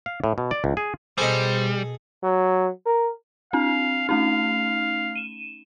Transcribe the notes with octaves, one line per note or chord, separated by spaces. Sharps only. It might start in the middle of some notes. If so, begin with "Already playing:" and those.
F5
A2
B2
D5
C#2
G#4
B2 G3 G#4 A4 C5 D#5
F#3
A#4
C4 D4 F5
A3 C#4 D#4 F5
D#7 E7